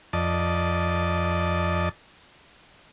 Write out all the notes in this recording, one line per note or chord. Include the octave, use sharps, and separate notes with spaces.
F2 D5 D#5 A5